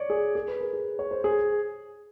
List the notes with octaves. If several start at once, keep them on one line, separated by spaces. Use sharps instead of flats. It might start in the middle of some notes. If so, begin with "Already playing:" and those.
Already playing: C#5 D5
G#4
G#4
B4
A#4
G#4
C#5
C5
G#4